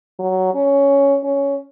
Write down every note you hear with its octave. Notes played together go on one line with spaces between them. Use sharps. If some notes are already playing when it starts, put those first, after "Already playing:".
F#3
C#4
C#4